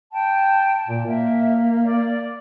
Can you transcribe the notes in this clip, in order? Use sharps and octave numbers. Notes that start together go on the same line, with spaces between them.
G5 A5
A#2
A#3 E5
D5